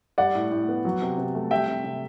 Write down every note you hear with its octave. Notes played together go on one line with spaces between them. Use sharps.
G3 D5 F#5
A2
A2
B3
F#3
C3
C3
A3
G3 E5 G5
C3
C3